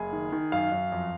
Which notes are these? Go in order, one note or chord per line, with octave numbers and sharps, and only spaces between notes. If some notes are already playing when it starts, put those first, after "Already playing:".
Already playing: F#1 G#4
D#3
D#3
F#2 F5
F#2
F2